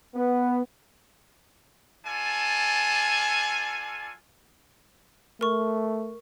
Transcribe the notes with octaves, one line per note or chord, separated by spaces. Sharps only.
B3
D4 F4 A4 G#5
A3 A#4 C#6